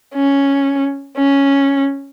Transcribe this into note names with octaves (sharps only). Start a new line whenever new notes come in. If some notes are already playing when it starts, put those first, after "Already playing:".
C#4
C#4